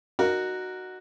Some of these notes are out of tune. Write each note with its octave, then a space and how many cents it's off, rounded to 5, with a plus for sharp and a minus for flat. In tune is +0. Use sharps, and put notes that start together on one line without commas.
D#4 -25 F#4 +0 A#4 +0